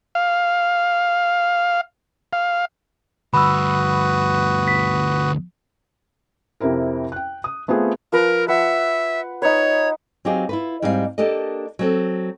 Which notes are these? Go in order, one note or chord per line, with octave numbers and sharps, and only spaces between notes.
F5
F5
D2 G2 F#4 B4 B5 D#6 E6
B6
F2 C3 C4 E4 A#4
G5 F#6
D#6
A3 B3 C4 F4 G#4 G5
F3 A#4 B4
B4 E5 F#5
D#4 B4 C#5
F#3 C4 D#4 G4 G#4 F5
E4 F4 B4
G#2 G3 C4 D#4 A4 F5
A#3 D4 G4 A4 A#4 D#5
F#3 C4 A4